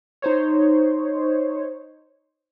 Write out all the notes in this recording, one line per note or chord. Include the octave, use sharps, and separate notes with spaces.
D#4 C5 C#5